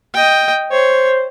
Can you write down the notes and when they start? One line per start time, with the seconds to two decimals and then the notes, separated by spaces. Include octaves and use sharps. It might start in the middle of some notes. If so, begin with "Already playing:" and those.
0.14 D#5 G5
0.72 C5 C#5